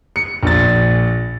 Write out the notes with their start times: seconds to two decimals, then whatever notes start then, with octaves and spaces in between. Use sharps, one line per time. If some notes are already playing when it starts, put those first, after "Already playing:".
0.16 C#7
0.43 A#1 A6